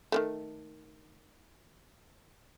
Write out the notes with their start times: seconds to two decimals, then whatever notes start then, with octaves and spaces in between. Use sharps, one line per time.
0.12 D#3 F#3 A3